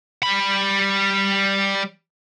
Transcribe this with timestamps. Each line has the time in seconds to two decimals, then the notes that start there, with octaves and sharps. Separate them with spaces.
0.23 G3 B5